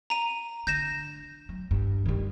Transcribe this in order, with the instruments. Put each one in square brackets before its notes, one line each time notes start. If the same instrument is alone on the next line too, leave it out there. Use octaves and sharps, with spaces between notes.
[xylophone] A#5 D#7
[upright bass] D3 [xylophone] G6 A#6 E7
[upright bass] F#3
G2
D#3 G3